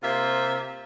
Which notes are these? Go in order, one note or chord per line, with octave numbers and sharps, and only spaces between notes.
C3 A#3 F4 C5 E5